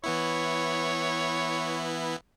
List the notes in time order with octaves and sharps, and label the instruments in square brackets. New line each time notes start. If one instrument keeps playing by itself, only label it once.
[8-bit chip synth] E3 B3 E4 [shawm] C#5